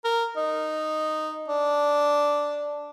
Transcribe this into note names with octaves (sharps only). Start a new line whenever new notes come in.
A#4
D#4
D4